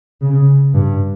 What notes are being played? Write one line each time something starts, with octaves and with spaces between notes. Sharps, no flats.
C#3
G2